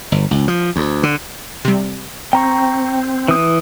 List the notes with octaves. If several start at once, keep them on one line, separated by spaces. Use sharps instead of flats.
G1
C#2
F3
D2
D3
C3 G3
C4 G5 A#5 C#6
E3 D#6